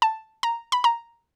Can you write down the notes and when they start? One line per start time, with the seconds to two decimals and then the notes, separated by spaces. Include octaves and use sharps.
0.02 A5
0.43 A#5
0.72 B5
0.84 A#5